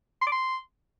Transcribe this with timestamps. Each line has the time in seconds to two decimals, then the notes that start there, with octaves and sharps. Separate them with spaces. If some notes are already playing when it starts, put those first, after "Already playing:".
0.21 C6
0.27 D6
0.32 C6